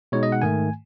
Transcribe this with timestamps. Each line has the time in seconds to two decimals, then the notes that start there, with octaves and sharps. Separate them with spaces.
0.12 B2 G#3 D#4 C#5
0.23 D#5
0.32 F#5
0.42 G#2 D#3 A3 G#5